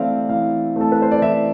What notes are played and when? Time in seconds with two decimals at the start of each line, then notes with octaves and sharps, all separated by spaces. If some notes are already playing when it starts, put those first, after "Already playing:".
Already playing: E3 A3 C4 E4 D5 E5 F5
0.29 E3 F5
0.76 A3 C4 E4 A4
0.92 B4
1.02 C5
1.11 D5
1.22 E3 E5